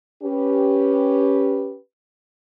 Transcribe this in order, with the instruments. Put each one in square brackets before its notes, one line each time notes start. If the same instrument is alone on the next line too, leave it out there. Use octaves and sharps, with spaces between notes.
[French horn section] C#4 G4 B4